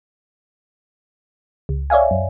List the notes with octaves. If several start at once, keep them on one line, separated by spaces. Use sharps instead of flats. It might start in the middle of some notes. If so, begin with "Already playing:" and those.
C#2
C#5 D5 E5 F5 G#5
F#2